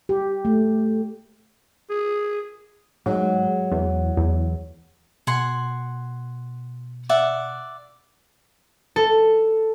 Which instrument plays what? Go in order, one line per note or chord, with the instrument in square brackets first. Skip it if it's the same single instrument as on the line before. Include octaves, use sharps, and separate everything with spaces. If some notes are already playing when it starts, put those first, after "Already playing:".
[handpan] G4
A3
[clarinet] G#4
[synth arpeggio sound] G#2 [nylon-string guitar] F#3 G#3
[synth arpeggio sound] E2
E2
[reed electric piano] B2 [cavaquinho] F#5 G#5 C6
[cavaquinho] D5 E5 F#5
[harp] A4